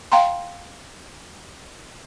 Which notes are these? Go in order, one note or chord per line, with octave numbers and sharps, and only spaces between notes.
F5 G5 A#5 C6